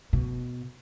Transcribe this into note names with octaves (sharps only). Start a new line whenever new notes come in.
B2